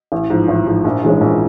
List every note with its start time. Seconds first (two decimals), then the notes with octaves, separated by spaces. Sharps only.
0.12 A1
0.30 G#2 F3
0.48 A1
0.66 G#2 F3
0.84 A#1
1.03 G#2 E3 G#3 C#4
1.21 A#1